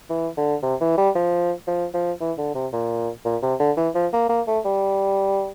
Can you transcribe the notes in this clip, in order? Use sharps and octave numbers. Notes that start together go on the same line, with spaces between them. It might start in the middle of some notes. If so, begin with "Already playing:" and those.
E3
D3
C3
E3
G3
F3
F3
F3
E3
D3
C3
A#2
A#2
C3
D3
E3
F3
A#3
A#3
A3
G3